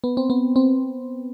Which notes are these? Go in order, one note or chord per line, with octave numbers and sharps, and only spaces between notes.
B3
C4
B3
C4